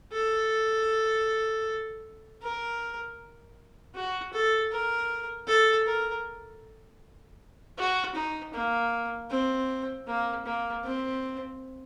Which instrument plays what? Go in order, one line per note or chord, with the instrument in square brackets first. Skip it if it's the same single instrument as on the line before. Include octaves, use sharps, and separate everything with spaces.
[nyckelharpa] A4
A#4
F#4
A4
A#4
A4
A#4
F#4
D#4
A#3
C4
A#3
A#3
C4